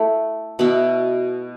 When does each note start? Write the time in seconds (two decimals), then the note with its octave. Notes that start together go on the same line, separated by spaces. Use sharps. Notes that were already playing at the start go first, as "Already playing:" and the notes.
Already playing: A3 E4 A4
0.59 B2 B3 E4